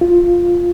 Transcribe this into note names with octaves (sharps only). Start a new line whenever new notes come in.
F4